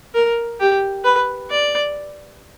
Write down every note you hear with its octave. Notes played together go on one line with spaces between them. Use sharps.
A#4
G4
B4
D5